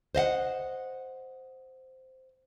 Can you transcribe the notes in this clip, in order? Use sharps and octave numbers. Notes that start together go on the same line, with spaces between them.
C5 D#5 F5 F#5